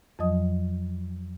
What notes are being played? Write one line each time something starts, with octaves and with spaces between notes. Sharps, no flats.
F2 F3 F#3 D#5 D#6